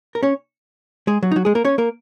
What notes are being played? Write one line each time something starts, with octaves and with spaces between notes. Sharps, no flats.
A#4
C#4 C#5
G#3 G#4
F#3 F#4
D#4
F#3 F#4
G#3 G#4
A#3 A#4
C#4 C#5
A#3 A#4